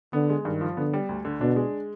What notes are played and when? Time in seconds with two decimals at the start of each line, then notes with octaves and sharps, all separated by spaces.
0.13 D3 B3
0.29 G#3
0.45 G2 D#3
0.61 F3
0.77 D3 B3
0.93 G3
1.09 D2
1.25 D3
1.41 B2 D4
1.56 G#3